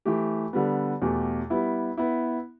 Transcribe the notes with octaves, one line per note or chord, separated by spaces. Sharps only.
E3 A3 G4
D3 G3 B3
E2 B2 A3 G4
G3 B3 E4
B3 E4